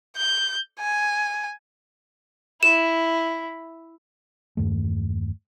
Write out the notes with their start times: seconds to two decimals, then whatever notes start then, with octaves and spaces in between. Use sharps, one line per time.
0.17 G6
0.80 G#5
2.63 E4 E7
4.57 E2 G2 D#3 A3